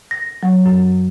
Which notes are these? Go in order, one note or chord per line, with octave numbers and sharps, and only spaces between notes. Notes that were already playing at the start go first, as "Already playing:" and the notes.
A#6
F#3
F#2